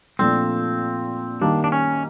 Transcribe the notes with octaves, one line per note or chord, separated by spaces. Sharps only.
A#2 F3 A3 C4 D4
D#3 G3 A#3 D4
D4
C#4